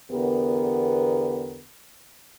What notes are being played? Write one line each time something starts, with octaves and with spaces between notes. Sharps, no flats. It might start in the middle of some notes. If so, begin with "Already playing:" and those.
E2 D3 B3 G4 A#4